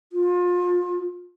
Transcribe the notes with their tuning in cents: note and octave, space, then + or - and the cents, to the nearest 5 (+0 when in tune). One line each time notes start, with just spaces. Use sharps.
F4 +30